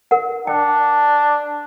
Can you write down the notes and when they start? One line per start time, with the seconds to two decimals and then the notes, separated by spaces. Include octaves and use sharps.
0.11 A#4 F#5
0.47 D4 G5